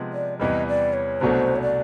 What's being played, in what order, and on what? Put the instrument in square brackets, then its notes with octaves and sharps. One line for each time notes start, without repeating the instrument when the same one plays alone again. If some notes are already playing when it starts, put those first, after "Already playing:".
Already playing: [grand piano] C3 F3 G#3 B3
[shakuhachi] D5
[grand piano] E2 C3 E3 G3 [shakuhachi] D#5
[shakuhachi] D5
C#5
[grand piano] C2 B2 F#3 A3 D4 [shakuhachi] C5
[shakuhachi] C#5
D5